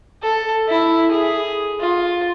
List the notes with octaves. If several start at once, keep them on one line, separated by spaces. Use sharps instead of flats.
A4
E4
G#4
F4